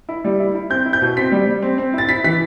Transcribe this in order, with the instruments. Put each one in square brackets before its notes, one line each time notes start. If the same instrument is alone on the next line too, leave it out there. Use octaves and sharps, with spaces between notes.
[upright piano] E4
G3
E4
E4
C4 G6
E4
G6
B2
C4 B6
G3
G3
C4
C4
E4 A6
E4 B6
E3 B6